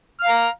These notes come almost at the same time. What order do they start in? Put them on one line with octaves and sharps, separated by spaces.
F6 F5 A#5